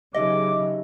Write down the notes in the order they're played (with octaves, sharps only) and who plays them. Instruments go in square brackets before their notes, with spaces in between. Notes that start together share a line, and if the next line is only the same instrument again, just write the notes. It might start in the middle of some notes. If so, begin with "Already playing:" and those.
[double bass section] C#3 E3 F#3 [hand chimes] D#4 G4 E5 [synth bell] D#5 [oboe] D6